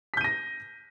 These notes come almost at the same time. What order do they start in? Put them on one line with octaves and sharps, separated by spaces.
B6 G6 D#7 A#6